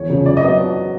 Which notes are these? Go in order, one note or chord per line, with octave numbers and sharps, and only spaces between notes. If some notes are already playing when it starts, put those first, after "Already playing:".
Already playing: E2 C#5
C#3 F3
F#1 D5
D#5
B2 F#3 B3